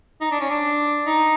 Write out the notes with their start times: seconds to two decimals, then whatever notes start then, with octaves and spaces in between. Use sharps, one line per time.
0.21 D#4
0.31 D4
0.41 C#4
0.50 D4
1.07 D#4